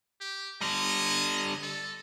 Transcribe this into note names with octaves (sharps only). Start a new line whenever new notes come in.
G4
D3 G3 D#5
A4